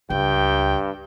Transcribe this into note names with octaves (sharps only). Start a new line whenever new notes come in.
C#2 G2 G5